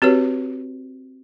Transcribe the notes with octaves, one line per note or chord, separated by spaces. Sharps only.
C4 F#4 G4 B4 C#5